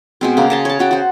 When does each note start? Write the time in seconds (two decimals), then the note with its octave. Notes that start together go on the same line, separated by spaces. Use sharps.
0.21 B2 G#3 C4
0.37 C#3 A#3
0.50 C#3 A5 C6
0.65 C#5 A5
0.79 C#3 F#4 G5
0.91 F#4 C5